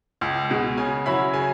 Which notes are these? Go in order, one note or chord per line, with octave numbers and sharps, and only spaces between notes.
C#2
B2 G#3
C#3 G#5
F#3 C#4 E4 B5
C#3 G#5